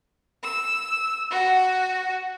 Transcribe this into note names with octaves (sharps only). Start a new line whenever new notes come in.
E6
F#4